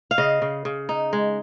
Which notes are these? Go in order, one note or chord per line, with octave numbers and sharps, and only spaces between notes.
F5
C#3 D#5
C#3
C#3
D#4
G#3